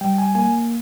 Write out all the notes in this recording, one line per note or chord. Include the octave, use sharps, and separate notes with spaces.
G3 G5
G#5
A#3 G#5